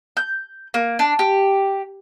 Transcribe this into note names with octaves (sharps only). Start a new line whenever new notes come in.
G6
A#3
D4
G4